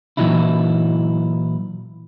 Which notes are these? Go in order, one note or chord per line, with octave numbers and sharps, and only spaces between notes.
A#2 E3 F#3 D#4 E4